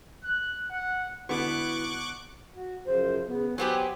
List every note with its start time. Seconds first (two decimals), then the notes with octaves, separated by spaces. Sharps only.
0.24 F#6
0.70 F#5
1.29 D3 B3 E4 F#4 B4 C#6 D6 F#6
2.55 F#4
2.86 F#2 C#3 F3 C5
3.27 C#3 B3
3.58 F#3 B3 G4 C5 G5 G#5